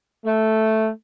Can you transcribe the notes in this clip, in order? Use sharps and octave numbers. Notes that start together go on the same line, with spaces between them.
A3